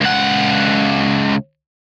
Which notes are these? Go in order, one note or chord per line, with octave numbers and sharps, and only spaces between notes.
C#2 F#5